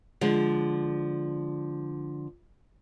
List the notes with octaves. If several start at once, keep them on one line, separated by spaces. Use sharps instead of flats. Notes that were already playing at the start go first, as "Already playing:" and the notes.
D3 F3 G#3